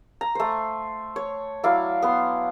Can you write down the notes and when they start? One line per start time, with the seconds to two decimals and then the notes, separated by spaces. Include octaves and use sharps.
0.21 A#5
0.35 A3 C5
1.16 C#5
1.64 F#3 E4 D5 F5
2.02 B3 C6